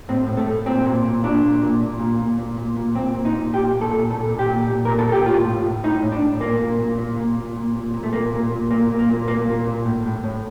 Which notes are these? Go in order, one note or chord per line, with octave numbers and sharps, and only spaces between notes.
A2 C4
A2
A3
A2
A#2 C4
A#2
A#2
A#2 D4
A#2
A#2
A#2
A#2
A#2
A#2
A#2
A#2
A#2 C4
A#2
D#4
A#2
A#2 G4
A#2
A4
A#2
A#2 A4
A#2
G4
A#2
A#2
A#2 A#4
A4
A#2
G4
A2 F4
A2
A2
A2 D#4
A2
D4
A2
A#2 A#3
A#2
A#2
A#2
A#2
A#2
A#2
A#2
A#2
A3
A#2 A#3
A#2
A#2
A#2 A#3
A#2
A#3
A#2
A#2 A#3
A#2
A#2
A2
A2
A2